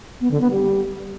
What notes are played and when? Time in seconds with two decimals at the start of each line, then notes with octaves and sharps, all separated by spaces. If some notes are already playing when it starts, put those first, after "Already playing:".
0.21 B3
0.31 D3
0.41 B3
0.51 G3